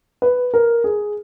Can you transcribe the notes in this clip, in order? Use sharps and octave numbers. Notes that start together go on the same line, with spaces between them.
B4
A#4
G#4